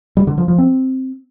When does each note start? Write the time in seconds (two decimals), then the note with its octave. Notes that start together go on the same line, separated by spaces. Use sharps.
0.17 G3
0.27 D3
0.38 F3
0.48 F3
0.58 C4